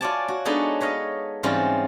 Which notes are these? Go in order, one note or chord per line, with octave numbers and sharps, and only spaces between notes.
F4 F#4 C#5 D5 G#5 A5
F#4
G#3 B3 D4 D#4 A4 C#5
B4 C#5 D#5 F5
G#2 E3 G3 C4 C#4 F4